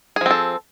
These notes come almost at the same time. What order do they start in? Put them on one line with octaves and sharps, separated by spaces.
G#4 F3 C4 A4